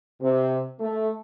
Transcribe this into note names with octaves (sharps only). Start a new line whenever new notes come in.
C3
A3